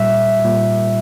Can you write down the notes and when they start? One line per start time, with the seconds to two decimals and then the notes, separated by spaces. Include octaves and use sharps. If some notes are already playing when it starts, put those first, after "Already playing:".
Already playing: A#2 G3 E5
0.45 A#2 G3